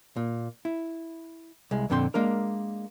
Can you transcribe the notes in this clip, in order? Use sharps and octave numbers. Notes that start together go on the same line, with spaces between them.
A#2
E4
C2 G#3
F2 A#2 D3 C4 G5 C6
G#3 A#3 D4 A#4